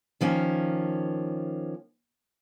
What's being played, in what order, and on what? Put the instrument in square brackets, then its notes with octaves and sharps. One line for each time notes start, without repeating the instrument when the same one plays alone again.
[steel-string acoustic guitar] D#3 F3 A#3 C#4